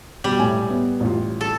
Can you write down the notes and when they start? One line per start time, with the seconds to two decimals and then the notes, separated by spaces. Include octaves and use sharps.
0.24 B2 G3
0.39 A2 G#5
0.70 B3
1.00 A1 F4
1.41 A4